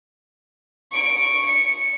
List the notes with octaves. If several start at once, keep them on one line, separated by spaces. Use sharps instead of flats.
C#6 D7
C#7